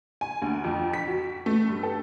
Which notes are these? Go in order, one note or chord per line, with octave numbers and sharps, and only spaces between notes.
G#5
D2
F2
B6
F#4
A3
G2
A4